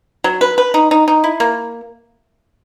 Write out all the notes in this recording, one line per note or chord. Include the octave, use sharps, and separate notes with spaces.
F#3
B4
B4
D#4
D#4
D#4
E4
A#3